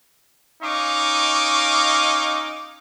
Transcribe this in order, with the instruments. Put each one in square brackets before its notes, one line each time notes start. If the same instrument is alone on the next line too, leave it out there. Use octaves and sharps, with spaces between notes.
[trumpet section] C#4 D#4 D#5 F5 C#6 D6